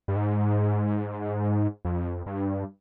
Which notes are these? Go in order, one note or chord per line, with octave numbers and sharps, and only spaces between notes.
G2
G#2
F2
G2